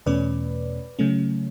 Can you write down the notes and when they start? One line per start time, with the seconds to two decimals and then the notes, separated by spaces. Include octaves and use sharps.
0.06 E2 B2 A3 C#4 B4 D5
0.99 C#3 F#3 A3 C#4